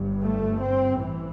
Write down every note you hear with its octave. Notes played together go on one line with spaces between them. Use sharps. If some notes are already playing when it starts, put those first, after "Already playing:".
Already playing: G1 G2
A3
C4
A1 E3